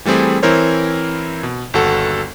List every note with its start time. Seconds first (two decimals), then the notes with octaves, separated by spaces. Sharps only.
0.05 E3 G3 A3 C4 G#4
0.43 E3 C4 E4 A#4 C5 C#5
1.43 B2
1.74 G1 D#2 F#4 A4 F#5